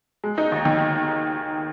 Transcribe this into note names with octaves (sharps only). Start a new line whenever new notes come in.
G#3
D#4
D#2
D#3